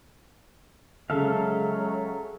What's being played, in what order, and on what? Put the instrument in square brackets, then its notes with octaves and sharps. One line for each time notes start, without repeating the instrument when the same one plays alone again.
[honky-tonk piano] C#3 [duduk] F#3 [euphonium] G#3 [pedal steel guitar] A4 E5 F5